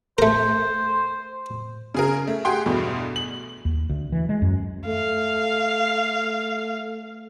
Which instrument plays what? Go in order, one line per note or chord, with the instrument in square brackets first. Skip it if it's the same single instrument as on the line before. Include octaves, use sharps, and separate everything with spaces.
[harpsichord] A3 A#4 [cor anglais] C5
[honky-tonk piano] C#3 G#4 A#4
A3
G4 G#4 F#5 G5 C6
E2 G2 B2 A3
F#7
[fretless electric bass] D#2
D2
E3
G#3
F#2
[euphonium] A3 [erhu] F5